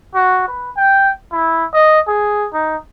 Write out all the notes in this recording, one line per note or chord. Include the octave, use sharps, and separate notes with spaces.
F#4
B4
G5
E4
D#5
G#4
D#4